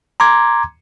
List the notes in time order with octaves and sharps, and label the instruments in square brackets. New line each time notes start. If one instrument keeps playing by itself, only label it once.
[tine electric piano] A#5 C6 D6 G#6